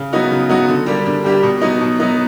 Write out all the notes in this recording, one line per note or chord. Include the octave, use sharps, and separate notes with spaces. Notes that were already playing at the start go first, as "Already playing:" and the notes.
Already playing: C#3
F#3 B3 D#4 F#4
C#3
F#3 B3 D#4 F#4
D3
G3 A#3 D4 G4
D3
G3 A#3 D4 G4
B2
F#3 B3 D#4
B2
F#3 B3 D#4